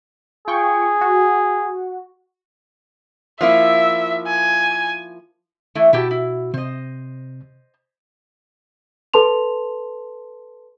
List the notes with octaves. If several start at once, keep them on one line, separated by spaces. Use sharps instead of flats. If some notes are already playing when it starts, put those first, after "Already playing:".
F4 G#4 G5 C#6
F#4
F3 A#3 E4 E5
G#5
E3 A3 E4
B2 E4 F#4 G4 A5
E4
C3 C5 D#5
A4 B4 A5 C6 F7